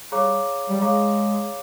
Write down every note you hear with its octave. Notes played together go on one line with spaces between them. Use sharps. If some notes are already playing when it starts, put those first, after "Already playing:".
G3 G#4 C#5 F5 A#5 D6
G3
G#3 G#4 C#5 F5 A#5 D6